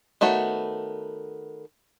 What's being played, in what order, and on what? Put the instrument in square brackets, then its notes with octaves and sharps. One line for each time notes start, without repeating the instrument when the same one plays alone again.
[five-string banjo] D#3 A3 B3 F#4 C#5